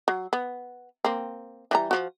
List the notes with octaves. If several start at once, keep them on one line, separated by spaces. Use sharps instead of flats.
F#3
B3
A#3 C4
E3 G3 A#5
F3 F#4